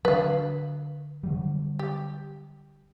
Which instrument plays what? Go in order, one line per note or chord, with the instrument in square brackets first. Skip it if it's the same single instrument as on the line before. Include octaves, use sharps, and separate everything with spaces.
[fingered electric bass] D3 F#3 [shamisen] B4 F5
[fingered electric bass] D3 F#3 G3
[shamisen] G4